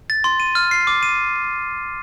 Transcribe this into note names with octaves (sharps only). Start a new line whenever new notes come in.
A6
C6
D#7
F6
C7
D6
D#7